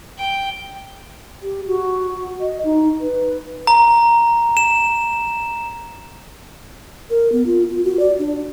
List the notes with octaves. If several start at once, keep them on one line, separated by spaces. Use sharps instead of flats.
G5
G4
F#4
D#5
D#4
B4
A#5
E7
A#4
B3
F4
F4
F#4
D5
D4